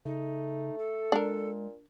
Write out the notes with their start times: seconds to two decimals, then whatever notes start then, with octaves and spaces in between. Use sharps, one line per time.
0.05 C#3 A3 D#4
0.78 A4
1.12 A#2 G#3 D4 A#4